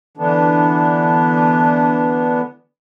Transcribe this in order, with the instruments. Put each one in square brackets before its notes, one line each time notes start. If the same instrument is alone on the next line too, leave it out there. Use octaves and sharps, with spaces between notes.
[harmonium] D3 E3 B3 D4